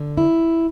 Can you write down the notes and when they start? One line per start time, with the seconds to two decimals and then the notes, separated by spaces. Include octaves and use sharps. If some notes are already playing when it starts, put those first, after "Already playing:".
Already playing: D3
0.17 E4